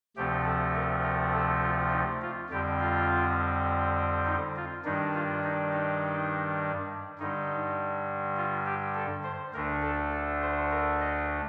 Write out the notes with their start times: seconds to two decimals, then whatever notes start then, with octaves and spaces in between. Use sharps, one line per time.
0.16 D2 C3 F3 A3 C4 G4
0.45 A4
0.75 A#4
1.03 A#4
1.34 A4
1.62 F4
1.92 D#4
2.22 F4
2.50 F2 D3 G3 C4 G4
2.80 F4
4.26 D#4
4.56 F4
4.84 G2 D#3 G3 D4 D#4
5.14 F4
5.44 D#4
5.73 D#4
7.19 G2 D3 G3 D#4
8.37 F4
8.66 G4
8.95 A4
9.24 C5
9.53 D2 D3 A3 D4 A#4
9.82 A4
10.12 A4
10.41 C5
10.71 A#4
11.00 D#5